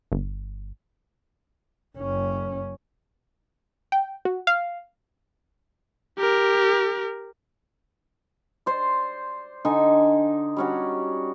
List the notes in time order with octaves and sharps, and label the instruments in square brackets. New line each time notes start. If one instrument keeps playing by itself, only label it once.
[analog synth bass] G1
[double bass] F#1 C#4
[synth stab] G5
F#4
F5
[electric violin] G4 A#4
[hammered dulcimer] C5 D5
D3 D#4 G#5
G3 C#4 F#4